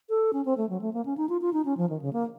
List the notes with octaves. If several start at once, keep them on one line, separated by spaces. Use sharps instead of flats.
A4
C#4
C4
A3
F#3
A3
A#3
C#4
D#4
F4
F4
D#4
C#4
F3
D#3
C#3
A#3